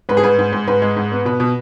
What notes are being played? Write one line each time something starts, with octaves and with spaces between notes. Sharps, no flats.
G#2 B4
G#4
G#2 B4
G#2
G#2
G#2 B4
G#3
G#2
B3
B2 B4
B2